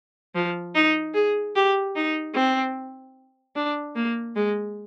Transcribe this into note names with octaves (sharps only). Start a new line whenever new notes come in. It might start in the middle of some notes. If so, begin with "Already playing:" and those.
F3
D#4
G#4
G4
D#4
C4
D4
A#3
G#3